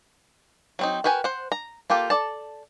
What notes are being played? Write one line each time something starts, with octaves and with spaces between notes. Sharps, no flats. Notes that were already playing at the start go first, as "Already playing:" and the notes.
F#3 C4 D#4
F#4 A#4 B4 G5 G#5
C5 F#5
A#5
A#3 F4 G4 A4
A4 D5 A5